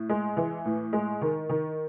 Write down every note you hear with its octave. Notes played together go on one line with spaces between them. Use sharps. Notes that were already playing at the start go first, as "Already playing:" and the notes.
Already playing: A2
G#3
E3
A2
G#3
D#3
D#3